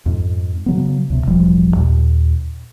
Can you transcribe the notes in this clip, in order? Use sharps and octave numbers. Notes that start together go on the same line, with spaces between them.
F2 G#2
C#3 F#3 B3
C#2 C3
E1 A1 F3 G3
D#2 A#2